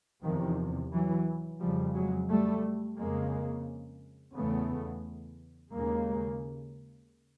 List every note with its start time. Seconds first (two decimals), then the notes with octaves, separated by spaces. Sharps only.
0.24 E2 C3 D#3 F3
0.92 E3 F#3
1.61 F2 C#3 F3 G3
1.96 F#3 G#3
2.30 G3 A3
2.99 F2 C#3 G#3 A#3
4.36 E2 C#3 A3 B3
5.73 D#2 C#3 G#3 A#3